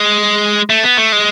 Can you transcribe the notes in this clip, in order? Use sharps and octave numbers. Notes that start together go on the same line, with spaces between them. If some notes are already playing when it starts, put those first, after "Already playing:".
Already playing: G#3
A3
B3
A3
G#3